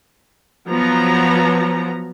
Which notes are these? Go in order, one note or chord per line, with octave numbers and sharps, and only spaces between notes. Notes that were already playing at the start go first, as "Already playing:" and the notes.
F3 F#3 B3 A#5